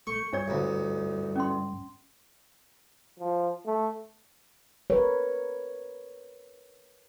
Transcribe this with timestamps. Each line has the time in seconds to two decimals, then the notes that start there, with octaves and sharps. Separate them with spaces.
0.07 A3 C#6 G6
0.33 G2 D4 C#5 D5
0.48 A1 D2
1.36 C#4 C6
3.19 F3
3.65 A3
4.90 A#4 B4 C#5